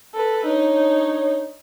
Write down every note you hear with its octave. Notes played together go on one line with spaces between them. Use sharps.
A4 B4
D4 D#4 C#5